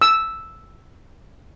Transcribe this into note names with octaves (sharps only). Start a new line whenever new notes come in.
E6